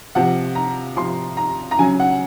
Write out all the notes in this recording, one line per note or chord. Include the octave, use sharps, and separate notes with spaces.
C3 F3 F#5
A#5
C3 F3 C6
A#5
A#5
C#3 F#3 G#5
F#5